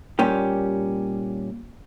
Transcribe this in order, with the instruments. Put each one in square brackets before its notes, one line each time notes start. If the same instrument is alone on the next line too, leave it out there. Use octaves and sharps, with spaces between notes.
[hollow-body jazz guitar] A#2 G3 C#4 G4